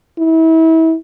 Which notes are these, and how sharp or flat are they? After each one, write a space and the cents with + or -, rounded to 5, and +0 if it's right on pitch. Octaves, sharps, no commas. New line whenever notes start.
E4 -30